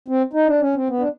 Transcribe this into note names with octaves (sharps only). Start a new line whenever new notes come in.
C4
D#4
D4
C#4
C4
B3
D4